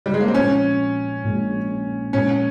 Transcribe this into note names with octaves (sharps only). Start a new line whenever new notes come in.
G3
G#3
A#3
C4
A#1 A#2 F3 G#3 C#4
A#1 A#2 F3 G#3
A#2 F3 G#3 C#4